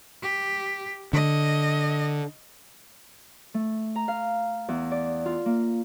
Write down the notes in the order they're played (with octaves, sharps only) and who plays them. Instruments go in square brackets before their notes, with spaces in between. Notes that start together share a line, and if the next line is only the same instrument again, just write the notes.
[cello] G4
[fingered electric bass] D3 [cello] D#5
[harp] A3
A#5
F5
E2
D5
F4
A#3